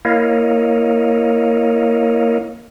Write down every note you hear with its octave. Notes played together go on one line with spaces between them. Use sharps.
A#3 E4 A#4 C#5 D#5 F5